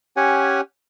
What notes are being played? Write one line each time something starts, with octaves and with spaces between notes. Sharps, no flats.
C#4 G4 C#5 F#5 G#5